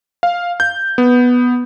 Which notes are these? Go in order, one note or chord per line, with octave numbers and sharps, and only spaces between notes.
F5
G6
B3